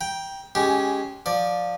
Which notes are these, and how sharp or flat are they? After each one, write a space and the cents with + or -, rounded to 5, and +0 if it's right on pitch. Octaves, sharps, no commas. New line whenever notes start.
G5 +0 A#5 +35
G#3 +0 C#4 +10 G4 -10
F3 +15 D5 +5